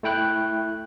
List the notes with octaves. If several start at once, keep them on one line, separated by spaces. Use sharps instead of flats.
A3 E4 G5 F#6